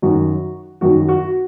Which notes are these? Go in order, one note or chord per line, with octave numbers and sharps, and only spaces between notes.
F#2 D#3 F#3 F#4
F#2 D#3 F#3 F#4
F#4